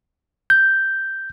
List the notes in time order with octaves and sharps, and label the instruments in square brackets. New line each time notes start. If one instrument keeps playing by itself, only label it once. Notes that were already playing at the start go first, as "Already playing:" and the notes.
[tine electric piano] G6